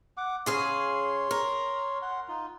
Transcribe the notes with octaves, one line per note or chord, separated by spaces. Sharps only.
F#5 D6
C#3 G#4 C#5 F5 C6
A#4
F#5 C6
D#4 F4